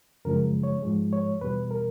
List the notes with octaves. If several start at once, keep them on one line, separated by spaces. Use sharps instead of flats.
F#2 C#3 F3 G#3 A#4
C#5
G#2 F3 G#3
C#5
E2 B2 G3 B4
A#4